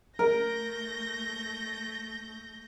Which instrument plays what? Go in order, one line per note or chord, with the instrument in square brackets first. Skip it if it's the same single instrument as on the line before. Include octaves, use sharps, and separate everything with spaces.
[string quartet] A3 G6 A#6 [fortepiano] A#4